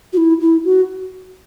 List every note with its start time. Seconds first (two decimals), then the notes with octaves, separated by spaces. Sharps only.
0.13 F#4
0.17 E4
0.41 E4
0.65 F#4